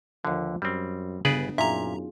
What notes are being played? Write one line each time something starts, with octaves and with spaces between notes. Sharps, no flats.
D#2 D3 F3
F#2 G3 C4
G1 C#3 B3 D4 G#4 B4 D5
F#2 A#2 D#4 F4 G#4 E5 A#5